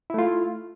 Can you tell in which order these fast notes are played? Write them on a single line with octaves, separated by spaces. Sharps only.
E4 A3 F4